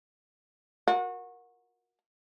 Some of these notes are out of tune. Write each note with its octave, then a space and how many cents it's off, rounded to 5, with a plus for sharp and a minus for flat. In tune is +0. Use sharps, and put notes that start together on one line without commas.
F#4 -25 A#4 +10